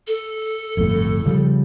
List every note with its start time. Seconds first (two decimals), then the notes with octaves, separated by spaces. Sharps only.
0.08 A4
0.77 G1 F2 A2
1.25 C#3 F3 G3